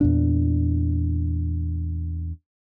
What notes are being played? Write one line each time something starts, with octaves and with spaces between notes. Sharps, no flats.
E2 A#2 D4